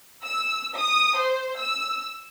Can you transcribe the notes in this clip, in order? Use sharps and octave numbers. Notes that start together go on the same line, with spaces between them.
E6
D#6
C5
E6